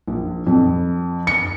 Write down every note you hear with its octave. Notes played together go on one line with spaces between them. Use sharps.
A#1
F2
C#7